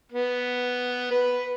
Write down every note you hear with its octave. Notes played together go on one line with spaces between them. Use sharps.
B3
B4